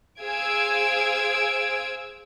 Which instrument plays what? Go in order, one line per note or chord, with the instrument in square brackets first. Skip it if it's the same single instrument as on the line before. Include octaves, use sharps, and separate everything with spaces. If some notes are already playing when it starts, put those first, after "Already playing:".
[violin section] G#4 C5 F5 E6 G#6 D7